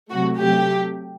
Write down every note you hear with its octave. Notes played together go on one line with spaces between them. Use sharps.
C3 F#3 A3 F#4
C3 F#3 A3 G4